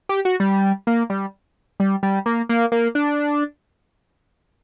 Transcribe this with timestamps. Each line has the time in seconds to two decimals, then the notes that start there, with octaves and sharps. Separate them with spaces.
0.09 G4
0.25 F#4
0.40 G3
0.87 A#3
1.10 G3
1.80 G3
2.03 G3
2.26 A#3
2.49 A#3
2.72 A#3
2.95 D4